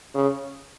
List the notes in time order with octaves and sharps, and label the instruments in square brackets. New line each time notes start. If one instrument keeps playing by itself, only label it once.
[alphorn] C#3